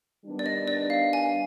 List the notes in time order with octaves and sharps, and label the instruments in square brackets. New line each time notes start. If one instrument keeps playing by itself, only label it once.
[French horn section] D#3 G3 B3 D4
[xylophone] D5
D#5
D5
F5
G#5